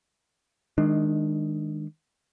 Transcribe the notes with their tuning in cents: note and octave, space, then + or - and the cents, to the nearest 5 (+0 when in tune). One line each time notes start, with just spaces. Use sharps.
D#3 +15 G#3 +0 D4 +30